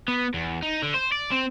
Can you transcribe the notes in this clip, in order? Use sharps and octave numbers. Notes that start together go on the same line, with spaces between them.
B3
E2
D#4
D3
C5
D5
C4